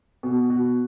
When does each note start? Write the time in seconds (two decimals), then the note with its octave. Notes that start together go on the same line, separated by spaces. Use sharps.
0.23 B2
0.50 F#4